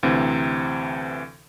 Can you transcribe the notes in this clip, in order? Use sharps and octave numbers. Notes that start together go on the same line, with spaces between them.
D2 C3 E3 C4